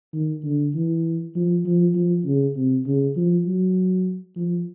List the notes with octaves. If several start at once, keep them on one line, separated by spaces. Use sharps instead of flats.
D#3
D3
E3
F3
F3
F3
C#3
C3
C#3
F3
F#3
F3